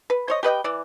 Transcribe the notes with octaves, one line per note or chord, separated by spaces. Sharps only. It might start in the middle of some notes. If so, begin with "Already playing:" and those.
B4
C5 C#5 D#5
G4 B4 D#5 G5
E3 D5